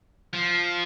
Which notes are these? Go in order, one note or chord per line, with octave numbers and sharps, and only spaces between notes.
F3